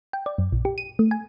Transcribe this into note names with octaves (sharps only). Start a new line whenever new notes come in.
G5
D5
F#2
A#1
G4
D#7
A3
G#5